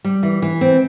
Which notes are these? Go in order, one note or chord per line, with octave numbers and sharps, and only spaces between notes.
G3
E3
E3
C4